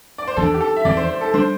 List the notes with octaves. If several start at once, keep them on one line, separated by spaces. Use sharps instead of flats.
D5
C5
E2 E3 A3 D4 A4
G4
A4
E5
E2 E3 C4 D5
C5
C5
A4
G3 D4 C5